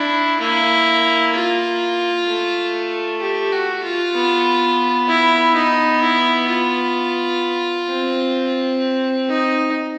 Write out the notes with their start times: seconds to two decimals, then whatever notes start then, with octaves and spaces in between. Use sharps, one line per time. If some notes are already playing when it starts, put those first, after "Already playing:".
Already playing: D4 E4
0.40 A#3 E4
1.34 F4
2.27 A3
3.21 G4
3.52 F#4
3.84 F4
4.14 B3
5.08 E4
5.55 D#4
6.01 E4
6.49 F4
7.89 C4
9.29 D#4